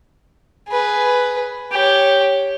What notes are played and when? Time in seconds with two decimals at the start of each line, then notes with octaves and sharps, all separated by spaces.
0.69 G#4 B4
1.72 G4 C#5